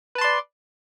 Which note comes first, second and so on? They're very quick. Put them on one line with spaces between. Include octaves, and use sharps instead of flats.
B4 A5 C6 D5